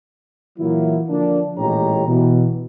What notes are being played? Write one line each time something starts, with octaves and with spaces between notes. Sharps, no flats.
A#2 E3 F#3 A#3 E4
D3 F3 A#3 D4
A1 A#2 G#3 G4 C#5 A#5
B2 E3